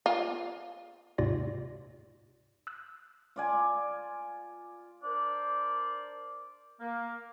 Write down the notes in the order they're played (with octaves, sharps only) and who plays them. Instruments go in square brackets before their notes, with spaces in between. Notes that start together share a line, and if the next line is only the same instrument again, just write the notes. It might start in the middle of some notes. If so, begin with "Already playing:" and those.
[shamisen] F4
[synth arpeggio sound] D#2 G#2 C3 F4 D5 A#6
E6 F#6
[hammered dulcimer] F4 D5 G#5
[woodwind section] D4 A#4 C5 D5
A#3